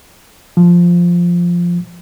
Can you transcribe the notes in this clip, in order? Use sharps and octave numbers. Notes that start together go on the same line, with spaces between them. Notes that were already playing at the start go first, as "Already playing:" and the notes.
F3